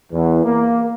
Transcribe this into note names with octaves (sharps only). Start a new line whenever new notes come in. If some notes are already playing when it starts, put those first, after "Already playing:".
E2
A#3